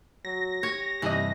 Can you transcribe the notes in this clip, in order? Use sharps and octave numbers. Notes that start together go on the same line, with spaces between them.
F#3 A#6
G4 C#5
G2 C3 E3 D#5